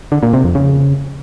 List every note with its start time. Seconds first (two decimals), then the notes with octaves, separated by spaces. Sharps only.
0.12 D3
0.23 A#2
0.33 C3
0.44 F2
0.55 C#3